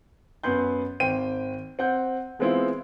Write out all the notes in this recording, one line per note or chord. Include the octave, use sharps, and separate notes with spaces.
F#2 B3 B4 C6 G6
G#1 C5 G5 D#7
C4 F#5 G6
E3 G#3 B3 C4 E4 F4